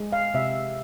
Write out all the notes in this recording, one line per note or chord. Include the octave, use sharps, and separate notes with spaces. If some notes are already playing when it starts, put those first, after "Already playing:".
Already playing: G#3
F5
C3 E5